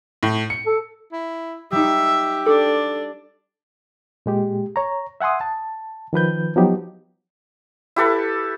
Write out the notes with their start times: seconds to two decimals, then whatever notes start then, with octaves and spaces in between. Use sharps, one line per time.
0.23 A2
0.50 C#7
0.66 A4
1.12 E4
1.72 G3 D#4 G4 E5
2.46 D4 A4 D6
4.26 A#2 G#3 G4
4.76 C#5 A#5
5.21 E5 F#5 G#5 C6 D#6
5.41 A5
6.13 D#3 F3 B4 G6
6.56 F3 F#3 B3 D#4 G4
7.96 E4 G4 A4 B4